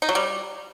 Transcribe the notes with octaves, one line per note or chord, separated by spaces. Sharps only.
D#4
F#3
G3